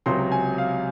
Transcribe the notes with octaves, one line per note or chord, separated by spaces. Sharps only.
C#2 C3 F#3 C6
G#5
F5